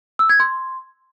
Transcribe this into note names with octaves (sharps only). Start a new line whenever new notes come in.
E6
G#6
C6